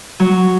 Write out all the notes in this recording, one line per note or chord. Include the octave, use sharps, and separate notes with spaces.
F#3